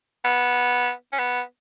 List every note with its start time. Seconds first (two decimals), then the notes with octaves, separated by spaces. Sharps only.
0.25 B3
1.12 C#4
1.19 B3